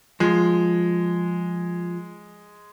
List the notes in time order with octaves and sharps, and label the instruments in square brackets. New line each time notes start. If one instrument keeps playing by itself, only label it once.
[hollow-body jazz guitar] F3 [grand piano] G#3